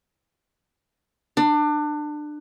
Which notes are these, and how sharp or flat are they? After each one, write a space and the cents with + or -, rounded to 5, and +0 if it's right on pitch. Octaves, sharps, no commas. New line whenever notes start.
D4 +25